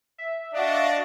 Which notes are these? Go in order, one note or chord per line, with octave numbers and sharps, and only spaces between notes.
E5
D4 F#4 D5 D#5 F5